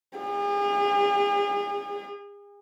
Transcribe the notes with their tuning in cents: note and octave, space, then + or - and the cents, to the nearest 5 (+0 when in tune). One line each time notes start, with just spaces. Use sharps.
G#4 -40